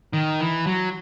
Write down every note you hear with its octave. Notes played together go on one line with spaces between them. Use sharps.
D#3
E3
F#3